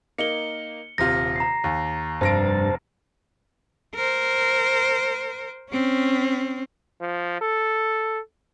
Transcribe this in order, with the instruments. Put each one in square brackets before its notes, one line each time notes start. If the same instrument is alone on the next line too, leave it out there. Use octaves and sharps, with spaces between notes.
[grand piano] A#3 D#4 [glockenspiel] C#7 G7
[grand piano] D#1 C3 F4 [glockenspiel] A#6
[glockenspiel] A#5 C7
[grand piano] D#2
[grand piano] F1 A#6 D7 [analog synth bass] G2 [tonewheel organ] C5 A5
[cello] A#4 C5
C4 C#4
[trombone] F3
A4